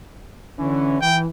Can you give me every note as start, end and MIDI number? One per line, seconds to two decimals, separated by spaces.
0.59 1.01 50
0.59 1.01 52
0.59 1.01 61
1.01 1.27 52
1.01 1.19 79